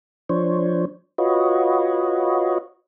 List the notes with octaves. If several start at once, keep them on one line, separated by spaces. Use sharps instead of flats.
F3 D4 C5 C#5
F4 F#4 B4 C#5 D#5